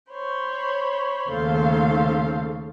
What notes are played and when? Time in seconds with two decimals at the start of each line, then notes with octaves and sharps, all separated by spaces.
0.12 C5 C#5 B5
1.29 D#2 C#3 A3 A4 C5 F5